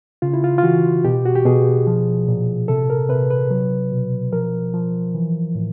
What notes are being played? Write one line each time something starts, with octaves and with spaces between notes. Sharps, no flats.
C#3 F4
E4
F4
F4
E3 F#4
B2 G4
F#4
G4
B2 G#4
F3
A#2
C3 A4
A#4
C3 B4
B4
F#3
B2
F3 A#4
F3
E3
A2